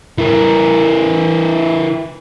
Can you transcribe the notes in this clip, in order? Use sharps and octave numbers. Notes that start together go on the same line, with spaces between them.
E3 A#4